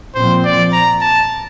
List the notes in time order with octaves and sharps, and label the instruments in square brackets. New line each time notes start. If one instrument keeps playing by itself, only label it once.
[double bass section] A#2 F3 C4 [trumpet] C5
[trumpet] D5
A#5
A5